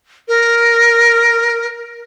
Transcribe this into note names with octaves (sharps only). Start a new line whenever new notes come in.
A#4